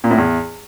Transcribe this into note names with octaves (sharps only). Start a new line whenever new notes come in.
A#2
A2
E2